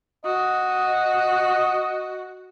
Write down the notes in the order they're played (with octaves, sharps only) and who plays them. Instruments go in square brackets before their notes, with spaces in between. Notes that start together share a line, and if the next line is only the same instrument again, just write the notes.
[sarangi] F#4 [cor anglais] D#5